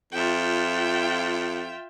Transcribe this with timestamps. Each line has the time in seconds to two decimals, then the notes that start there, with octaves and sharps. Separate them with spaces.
0.12 F2 F4 E5 G5